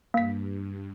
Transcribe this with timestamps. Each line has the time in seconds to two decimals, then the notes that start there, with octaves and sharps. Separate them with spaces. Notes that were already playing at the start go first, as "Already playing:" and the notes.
0.14 G2 A#3 B6